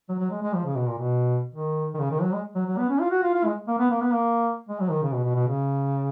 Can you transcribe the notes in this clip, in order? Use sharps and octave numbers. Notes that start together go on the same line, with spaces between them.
F#3
F#3
G#3
G#3
F3
C#3
B2
A#2
B2
D#3
D#3
C#3
D#3
F#3
G#3
F#3
F#3
B3
C#4
F4
F#4
F4
F4
G#3
A#3
B3
A#3
B3
A#3
G#3
F#3
D#3
C#3
B2
B2
B2
C#3